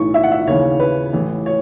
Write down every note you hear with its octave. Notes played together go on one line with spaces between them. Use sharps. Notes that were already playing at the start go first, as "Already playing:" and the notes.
Already playing: B1 A2 E3 C#6
E5
F#5
E5
D#2 C#3 E3 C#5
B4
A1 A2 E3
C#5